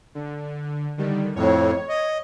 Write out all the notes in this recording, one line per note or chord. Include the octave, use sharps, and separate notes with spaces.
D3
D3 D#3 G3
F2 A2 C#5
D#5